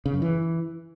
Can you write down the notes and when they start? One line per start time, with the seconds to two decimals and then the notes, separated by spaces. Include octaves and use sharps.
0.06 C#3
0.14 F#2
0.22 E3